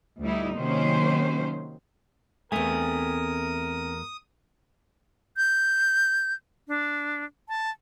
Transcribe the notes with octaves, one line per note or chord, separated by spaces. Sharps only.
D2 G3 D#4 E4
C3 D#3 F#3 A#3 C#4 C5
E2 A3 C4 A#4 E5 G#5 D#6
G6
D4
A5